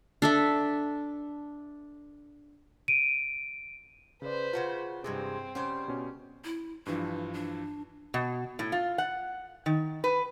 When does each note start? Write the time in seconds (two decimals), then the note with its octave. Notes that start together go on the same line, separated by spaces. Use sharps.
0.22 D4 A4 E5
2.88 D7 D#7
4.22 C#3 B4 C5 D5
4.53 C#3 F4 F#4 F#5 A5
5.04 G2 C3 E3 G#3 C4 G#4
5.55 C#3 G3 C#4 C5 F#5
5.88 B2 C#4
6.44 E4
6.86 G2 E3 F3 D4
7.33 D4
8.14 B2
8.59 A2
8.72 F4
8.98 F#5
9.66 D#3
10.04 B4